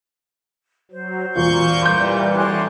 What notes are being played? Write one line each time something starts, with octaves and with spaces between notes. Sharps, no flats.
F#3 C5
E1 A#2 F4 C#6 G6
E3 G3 C6 G6
D2 A2 G#5 C6 D6 F#6